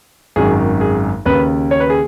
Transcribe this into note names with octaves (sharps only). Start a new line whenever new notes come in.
G#1 F#2 D#3 G#4
G#4
D#2 C#3 B4
C#5
B4
G#4